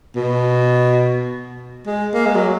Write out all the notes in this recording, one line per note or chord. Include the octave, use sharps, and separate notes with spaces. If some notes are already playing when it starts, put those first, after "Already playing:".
B2
G#3
A#3
G#3
F#3